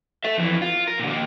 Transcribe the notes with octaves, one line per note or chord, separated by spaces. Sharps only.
A4 E5
F2 E3
F4
A#4
A#2 D3
D#3 A#3